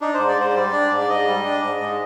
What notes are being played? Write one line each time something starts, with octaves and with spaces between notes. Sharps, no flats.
D4 D#4
G#2 C5
D5
G#2 C5
C5
G3 D5
D4
G#2
D5
G#2 D#5
G3
D4
G#2
G#2